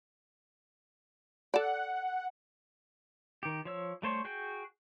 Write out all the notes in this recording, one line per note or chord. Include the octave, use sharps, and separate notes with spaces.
A4 D5 F#5
D#3 G4
F3 C#5 E6
G3 A3 C5 C#5
F#4 G#4 G5